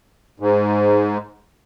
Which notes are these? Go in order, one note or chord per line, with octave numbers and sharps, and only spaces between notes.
G#2